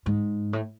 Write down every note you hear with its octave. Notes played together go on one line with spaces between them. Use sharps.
G#2
A2